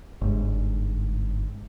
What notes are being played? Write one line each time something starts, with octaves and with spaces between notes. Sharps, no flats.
G1 G#2